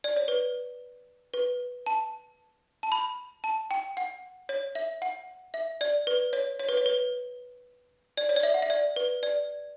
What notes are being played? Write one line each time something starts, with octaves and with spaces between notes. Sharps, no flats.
D5
C#5
B4
B4
A5
A5
B5
A5
G5
F#5
C#5
E5
F#5
E5
D5
B4
C#5
C#5
B4
C#5
B4
D5
C#5
D5
E5
F#5
E5
D5
B4
D5